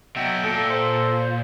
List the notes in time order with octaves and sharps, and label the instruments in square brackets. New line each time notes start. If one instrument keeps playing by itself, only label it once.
[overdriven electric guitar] B2 F#3 [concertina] E5 G5
[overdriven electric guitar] A#2 [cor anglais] A4
[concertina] C5